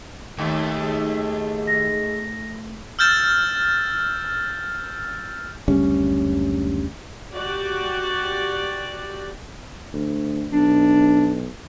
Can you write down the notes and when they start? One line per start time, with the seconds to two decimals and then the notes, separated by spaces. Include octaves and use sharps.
0.38 D#2 A3
0.81 G#3
1.67 A#6
2.99 E6 F6 G6 A6 E7
5.68 F#1 D2 G3 C#4
7.35 F#4 G4 D5
9.93 D2
10.52 B1 D4